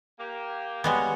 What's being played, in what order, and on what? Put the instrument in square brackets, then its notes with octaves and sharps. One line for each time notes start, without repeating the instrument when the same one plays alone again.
[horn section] A#3 G4
[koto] G3 G#3 B3 [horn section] C#5 F#5